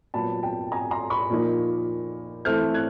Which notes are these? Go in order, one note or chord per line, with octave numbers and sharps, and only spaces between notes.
A#2 F#3 B3 A5 B5
G5 A5
G#5 A#5
A#5 C6
B5 C#6
A#2 F3 A#3 D#4
E3 A3 C4 F6 G6
F#6 G#6